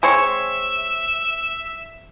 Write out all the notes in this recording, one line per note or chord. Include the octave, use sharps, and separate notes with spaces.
G#3 C4 C#5 E5